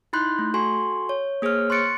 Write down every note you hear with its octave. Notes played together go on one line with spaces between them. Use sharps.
D#4 E4 B5 C6 F#6 G6
A3
F#4 A4 G#5 C6 C#6
C#5
A#3 G#4 C5 C#5 F6
C6 C#6 F#6 A6 C#7 D7